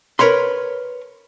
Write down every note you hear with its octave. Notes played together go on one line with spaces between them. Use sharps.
A#4 B4 C#5 B5 C6